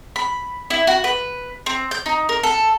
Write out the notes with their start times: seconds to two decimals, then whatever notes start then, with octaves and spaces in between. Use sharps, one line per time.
0.16 B5
0.70 E4
0.87 F#4
1.04 B4
1.66 C4
1.91 G6
2.06 D#4
2.29 A#4
2.43 A4